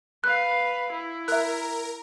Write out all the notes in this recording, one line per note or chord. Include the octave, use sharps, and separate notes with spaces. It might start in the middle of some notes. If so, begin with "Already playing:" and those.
B4 F5 F#6
E4
A#4 E5 F#6